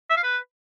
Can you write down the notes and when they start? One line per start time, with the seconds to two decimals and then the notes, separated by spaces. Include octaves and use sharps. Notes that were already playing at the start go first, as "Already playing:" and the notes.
0.10 E5
0.16 F5
0.23 B4